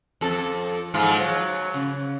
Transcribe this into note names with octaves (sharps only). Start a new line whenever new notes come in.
F2 A4
G#2 F3 F4
F#3
C#3